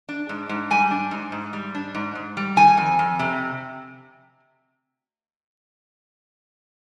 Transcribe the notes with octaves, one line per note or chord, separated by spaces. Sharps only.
D4
G#2
G#2
G3 G#5
D4
G#2
G#2
G3
D4
G#2
G#2
G3
D#3 G#5
F2
F2
C3